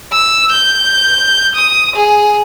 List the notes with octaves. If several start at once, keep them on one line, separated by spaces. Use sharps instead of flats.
E6
G6
D#6
G#4